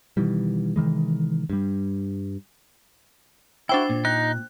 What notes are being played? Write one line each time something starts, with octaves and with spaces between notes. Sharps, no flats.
B2 D#3 E3 G3
C3 D#3 E3 G#3
G2 G3
D4 E4 F#4 C5 G5
A#2
D#4 F#6